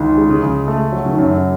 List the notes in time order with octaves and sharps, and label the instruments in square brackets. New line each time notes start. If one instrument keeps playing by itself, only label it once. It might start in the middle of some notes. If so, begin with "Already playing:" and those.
Already playing: [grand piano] C#2 [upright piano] D#3
[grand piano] G#3
[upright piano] C#3
[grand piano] C#2
A3
F#3
[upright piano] C#3
D#3
[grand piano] F#2 [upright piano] C#3